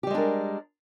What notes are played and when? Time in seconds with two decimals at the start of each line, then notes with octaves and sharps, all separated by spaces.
0.03 G4
0.07 G3
0.10 G#3
0.14 D4
0.18 A#4